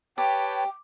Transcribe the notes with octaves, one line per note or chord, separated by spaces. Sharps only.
G4 B4 C#5 G5 A5